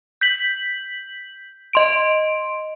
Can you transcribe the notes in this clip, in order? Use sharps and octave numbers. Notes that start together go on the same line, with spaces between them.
G6 B6 F#7
D#5 C6 D7